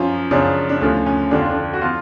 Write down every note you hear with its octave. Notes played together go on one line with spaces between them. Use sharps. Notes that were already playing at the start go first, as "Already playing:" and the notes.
Already playing: F#2 F3 C#4
F#2 C#3 F3 D4
D4
D2 D3 F3 C#4
C#4
F2 D3 F3 D4
F4
D4
F#4
F3 F4